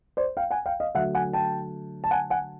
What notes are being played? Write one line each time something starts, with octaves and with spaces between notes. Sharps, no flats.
C5 D5
F5 G5
F#5 G#5
F5 G5
D#5 F5
D3 F#3 A3 E5 F#5
F#5 G#5
G5 A5
A5
F#5 G#5
F#5 G#5